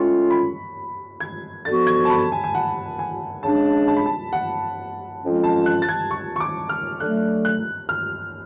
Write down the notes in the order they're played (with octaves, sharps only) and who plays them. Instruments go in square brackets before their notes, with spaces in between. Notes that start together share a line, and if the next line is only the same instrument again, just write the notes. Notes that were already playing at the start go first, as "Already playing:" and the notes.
Already playing: [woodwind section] A2 G#3 C#4 F4 [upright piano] C#6
[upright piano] B5
G#6
[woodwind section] D3 F3 B3 F#4 [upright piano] A6
[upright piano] G#6
A5
B5
G#5
G#5
F#5
G#5
[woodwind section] C#3 G#3 D4 [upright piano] A5
[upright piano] A5
B5
A5
F#5
[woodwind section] F2 F3 G#3 C#4 F4
[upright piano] A5
F#6
A6
G#6
C#6
C#6
D6
F6
[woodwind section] D3 F#3 A3 D4 [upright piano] F#6
[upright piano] F#6
F6